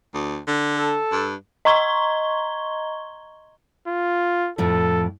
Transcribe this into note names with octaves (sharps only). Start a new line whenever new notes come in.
D2
D3
A4
G2
D#5 A#5 C6 C#6 G#6 G7
F4
F2 A2 F3 A4